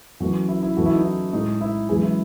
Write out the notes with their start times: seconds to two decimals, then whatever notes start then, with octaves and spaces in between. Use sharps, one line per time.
0.20 F#2 E3 A3 F#4
0.49 E4
0.63 E4
0.77 F#2 E3 A3 F#4
0.86 E4
0.95 D#4
1.03 E4
1.33 A2 G#3 D#4
1.61 E4
1.89 F#2 E3 G#3 G#4
2.03 E4